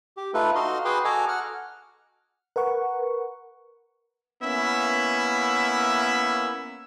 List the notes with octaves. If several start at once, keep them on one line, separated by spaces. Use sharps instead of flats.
G4
A3 D#4 F4 A4 B4
D#4 F#4 D#5 F5 C6
F#4 G#4 B4 G5 C6 D6
F#4 A4 D#5 G#5 A#5 D6
F#5 F6
A#4 B4 F#5 C#6
A#3 B3 C#4 E4 E5